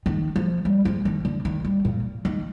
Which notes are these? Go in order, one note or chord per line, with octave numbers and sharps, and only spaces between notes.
D#3
F3
G3
F3
D#3
D3
D#3
G3
A#2
D#3